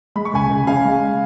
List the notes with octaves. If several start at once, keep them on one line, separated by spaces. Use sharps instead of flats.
G#3 B5
C#6
C#2 G#5 B5
C#2
C#3 F5 G#5
G#3